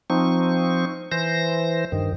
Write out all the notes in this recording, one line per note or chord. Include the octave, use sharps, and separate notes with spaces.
F3 C4 D#4 C#6
E3 C5 A#6
G2 D#3